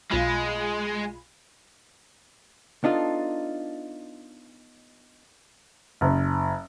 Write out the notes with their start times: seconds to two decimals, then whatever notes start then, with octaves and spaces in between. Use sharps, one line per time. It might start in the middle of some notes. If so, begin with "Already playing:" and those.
0.11 B1 G#3 F4 B5
2.84 B3 D4 D#4 F4 A4
6.01 F#1